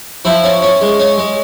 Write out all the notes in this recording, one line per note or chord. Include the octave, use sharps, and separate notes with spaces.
F3 E4
C#4
C#4
G#3
C#4
G#3